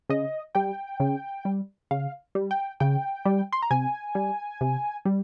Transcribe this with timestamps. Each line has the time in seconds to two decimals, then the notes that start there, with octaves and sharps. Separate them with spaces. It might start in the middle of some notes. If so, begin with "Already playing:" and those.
0.09 C#3 D#5
0.55 G3 G5
1.00 C#3
1.45 G3
1.91 C#3 F5
2.35 G3
2.51 G5
2.80 C#3 G5
3.25 G3
3.52 C6
3.62 A#5
3.71 C3 G#5
4.15 G3
4.61 C3
5.05 G3